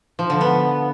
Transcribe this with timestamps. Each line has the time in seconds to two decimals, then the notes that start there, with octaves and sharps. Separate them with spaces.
0.19 F3
0.30 D3
0.41 B3